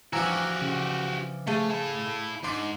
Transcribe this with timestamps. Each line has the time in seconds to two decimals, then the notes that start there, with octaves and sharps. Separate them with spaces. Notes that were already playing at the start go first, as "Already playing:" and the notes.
0.13 E3 F3 D4 F#4 G4 G#5 A#5 E6
0.62 C#3
1.47 A3 G#4 A4 F5
1.69 E4 A5
2.44 G#2 D4 C6